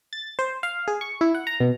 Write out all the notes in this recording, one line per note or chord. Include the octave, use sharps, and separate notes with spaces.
A6
C5
F5
G#4
C#6
E4
F#5
A#5
B2